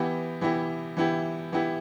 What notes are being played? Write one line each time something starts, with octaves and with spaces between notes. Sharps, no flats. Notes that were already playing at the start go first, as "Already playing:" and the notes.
Already playing: E3 B3 E4 G4
E3 B3 E4 G4
E3 B3 E4 G4
E3 B3 E4 G4